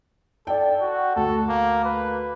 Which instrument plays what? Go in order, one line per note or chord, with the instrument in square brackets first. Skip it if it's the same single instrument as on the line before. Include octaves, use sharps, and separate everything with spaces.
[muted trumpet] A4 [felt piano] D5 G5
[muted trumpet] F#4
[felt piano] D2 [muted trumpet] A4
[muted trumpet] A#3
B4